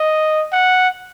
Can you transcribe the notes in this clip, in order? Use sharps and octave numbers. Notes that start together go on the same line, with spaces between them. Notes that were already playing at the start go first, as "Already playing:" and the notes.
Already playing: D#5
F#5